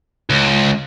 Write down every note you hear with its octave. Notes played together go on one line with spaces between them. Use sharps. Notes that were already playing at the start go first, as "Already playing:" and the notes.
C#2